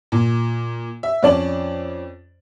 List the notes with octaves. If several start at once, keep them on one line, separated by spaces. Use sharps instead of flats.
A#2
E5
F2 C#4 D5 A5 F#7